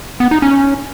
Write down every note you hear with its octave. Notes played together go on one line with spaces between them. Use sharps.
B3
D#4
C#4